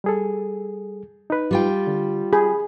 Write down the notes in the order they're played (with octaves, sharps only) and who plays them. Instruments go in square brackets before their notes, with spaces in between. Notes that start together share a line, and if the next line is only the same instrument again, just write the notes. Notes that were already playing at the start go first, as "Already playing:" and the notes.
[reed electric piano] G3 G#4 A4
D#4 B4
[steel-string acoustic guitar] G3 F4 G5
[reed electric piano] D3
[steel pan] G#4 [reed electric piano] B5